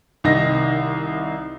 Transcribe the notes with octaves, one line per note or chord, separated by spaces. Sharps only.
C2 D#3 D#4 A#6